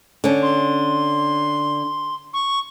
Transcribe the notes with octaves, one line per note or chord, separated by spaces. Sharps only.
D3 C#4
C6
C#6